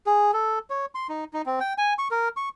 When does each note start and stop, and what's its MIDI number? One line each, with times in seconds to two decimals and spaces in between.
0.06 0.31 68
0.33 0.59 69
0.70 0.86 73
0.95 1.07 84
1.09 1.24 63
1.34 1.42 63
1.46 1.59 60
1.60 1.73 79
1.78 1.93 80
1.99 2.08 85
2.11 2.29 70
2.37 2.49 85